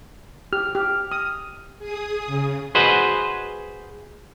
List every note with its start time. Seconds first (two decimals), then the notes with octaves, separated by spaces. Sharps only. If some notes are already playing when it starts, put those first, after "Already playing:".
0.53 G4 F6
0.75 G4
1.11 D#6
1.79 G#4 D#6
2.26 C#3
2.75 F#4 G#4 B4 C5 D#5 F#5